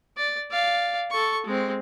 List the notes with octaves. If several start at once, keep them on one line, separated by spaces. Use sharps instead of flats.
D5
D5 F5
A4 C#6
G#3 C4